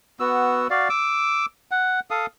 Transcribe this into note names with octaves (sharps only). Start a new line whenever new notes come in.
B3 F#4 E6
F#4 D5 F5
D6 E6
F#5
A4 F5 D#6